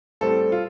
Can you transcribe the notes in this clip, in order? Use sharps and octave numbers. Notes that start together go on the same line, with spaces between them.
A2 G3 C4 A4
F4